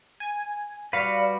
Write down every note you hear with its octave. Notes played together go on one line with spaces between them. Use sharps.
G#5
G3 F#4 B4 D5 F5